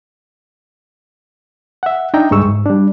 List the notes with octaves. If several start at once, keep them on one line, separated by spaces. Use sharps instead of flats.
E5 F#5
D4 D#4 E5 G5 A#5
C#2 G2 G#3 C#6 E6
G#2
G3 D4